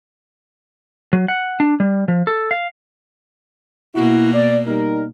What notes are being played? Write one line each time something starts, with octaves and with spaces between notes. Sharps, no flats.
F#3
F#5
D4
G3
F3
A4
F5
B2 A#3 E4 F#4
D5
G3 D#4 A#4